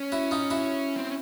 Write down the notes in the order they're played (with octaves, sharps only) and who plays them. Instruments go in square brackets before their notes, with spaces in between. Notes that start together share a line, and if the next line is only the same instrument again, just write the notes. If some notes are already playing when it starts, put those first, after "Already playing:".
Already playing: [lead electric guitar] C#4
[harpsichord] E4 F#4
D#4 F4
E4 F#4
[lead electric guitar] C4